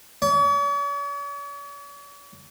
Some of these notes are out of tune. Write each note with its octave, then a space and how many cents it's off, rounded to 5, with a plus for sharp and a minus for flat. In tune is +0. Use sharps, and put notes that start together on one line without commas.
C#5 +45